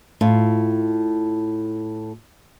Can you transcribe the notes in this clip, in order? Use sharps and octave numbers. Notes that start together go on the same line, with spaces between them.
A2 F4